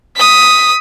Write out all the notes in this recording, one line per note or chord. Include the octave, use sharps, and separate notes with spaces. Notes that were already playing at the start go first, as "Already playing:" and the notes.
D#6 B6